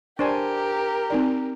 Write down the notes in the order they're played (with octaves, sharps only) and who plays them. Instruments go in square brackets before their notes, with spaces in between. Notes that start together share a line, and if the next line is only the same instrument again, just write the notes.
[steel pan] D4 C5 G#5 [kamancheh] G4 A#4
[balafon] C4 D#4 D5